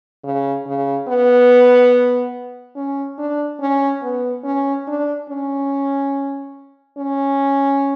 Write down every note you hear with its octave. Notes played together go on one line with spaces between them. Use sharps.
C#3
C#3
B3
C#4
D4
C#4
B3
C#4
D4
C#4
C#4